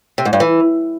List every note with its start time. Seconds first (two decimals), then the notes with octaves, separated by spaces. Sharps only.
0.18 C3
0.25 G#2
0.33 G2
0.40 E3